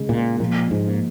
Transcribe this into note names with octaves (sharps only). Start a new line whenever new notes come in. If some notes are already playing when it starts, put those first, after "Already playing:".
Already playing: C#3 G#3
A#2
A#2 F3
G#2
A#3